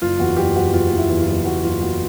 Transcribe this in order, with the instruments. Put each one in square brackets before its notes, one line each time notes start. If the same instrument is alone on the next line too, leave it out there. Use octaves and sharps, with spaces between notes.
[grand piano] F#1 F4
E2 F#4
F#1 G4
F#1 F#4
E2 F4
E2
E4
E2
F4
F#1
F#1 F#4
F#1 F4
E2 F#4